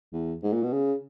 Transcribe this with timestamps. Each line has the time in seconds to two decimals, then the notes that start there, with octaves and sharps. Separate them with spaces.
0.13 E2
0.43 G#2
0.53 A#2
0.63 B2
0.73 C#3